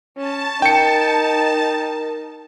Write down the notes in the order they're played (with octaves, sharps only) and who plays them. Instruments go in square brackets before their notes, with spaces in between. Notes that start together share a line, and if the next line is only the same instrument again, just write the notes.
[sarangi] C#4 [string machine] A5
[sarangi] D#4 [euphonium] A#4 [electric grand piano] G5 C#7